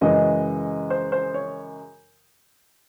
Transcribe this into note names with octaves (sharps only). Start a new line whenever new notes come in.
F#2 C#3 E3 G#3 D#5
C5
C5
C#5